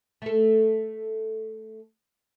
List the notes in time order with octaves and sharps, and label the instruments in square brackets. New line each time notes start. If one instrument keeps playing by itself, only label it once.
[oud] A3 A4